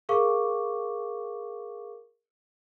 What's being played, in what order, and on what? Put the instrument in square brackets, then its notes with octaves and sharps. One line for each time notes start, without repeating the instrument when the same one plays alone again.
[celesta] G#4 A#4 F5 C#6 D6